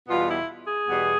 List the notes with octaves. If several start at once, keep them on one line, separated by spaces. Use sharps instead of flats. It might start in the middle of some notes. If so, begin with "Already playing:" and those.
E2 B2 G3 B3 F4
E4
G#4
E2 B2 G3 B3